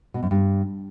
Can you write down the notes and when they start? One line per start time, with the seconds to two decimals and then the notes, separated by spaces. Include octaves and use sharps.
0.14 B2
0.23 F#2
0.31 G2